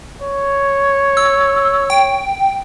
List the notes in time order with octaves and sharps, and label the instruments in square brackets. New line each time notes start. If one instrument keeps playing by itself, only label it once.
[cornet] C#5
[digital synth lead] E6
G5